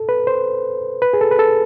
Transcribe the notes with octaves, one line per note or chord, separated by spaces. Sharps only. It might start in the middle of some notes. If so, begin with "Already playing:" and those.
Already playing: A4
B4
C5
B4
G#4
A4
B4
A4